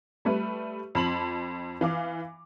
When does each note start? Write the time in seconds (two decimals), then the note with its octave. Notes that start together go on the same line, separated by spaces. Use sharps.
0.25 G3 A3 B4
0.95 F2 A5 B5 C6 F#7
1.81 E3 F5 D6